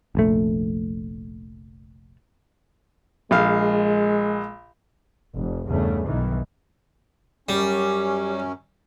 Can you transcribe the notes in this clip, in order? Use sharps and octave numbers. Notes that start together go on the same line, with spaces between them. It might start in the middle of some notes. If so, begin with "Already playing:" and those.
F1 A#1 A3
A#1 G#3 F5
F1
E2 G2 C#3 A3
B1 D#3 E3
F#2 G3 C#4 G4